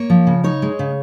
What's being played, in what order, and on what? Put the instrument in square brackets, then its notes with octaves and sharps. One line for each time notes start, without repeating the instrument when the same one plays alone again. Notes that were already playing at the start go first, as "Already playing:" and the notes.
Already playing: [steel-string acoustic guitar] A#3 C#5
F3
C#3
D#4 C#5
G#3
C#3